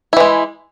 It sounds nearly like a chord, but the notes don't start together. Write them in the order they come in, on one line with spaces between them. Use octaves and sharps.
E4 E3 G#3